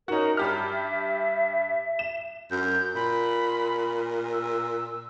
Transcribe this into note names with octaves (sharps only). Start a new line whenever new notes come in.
C#4 D#4 F#4 A#4
G2 G4 E5 F6
E7
F#2 G6
A#2 B5
E6